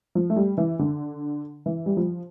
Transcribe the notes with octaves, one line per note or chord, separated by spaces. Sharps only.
F3
A3
G3
E3
D3
E3
G3
F3